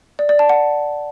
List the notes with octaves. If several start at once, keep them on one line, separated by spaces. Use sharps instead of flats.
D5
D5
A5
F#5